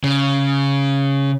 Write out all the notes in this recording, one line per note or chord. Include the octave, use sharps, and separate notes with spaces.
C#3